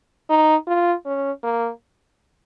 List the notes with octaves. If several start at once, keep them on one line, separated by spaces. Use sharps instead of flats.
D#4
F4
C#4
A#3